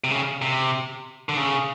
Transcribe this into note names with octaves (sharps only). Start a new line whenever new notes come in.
C3
C#3
C3
D3
C#3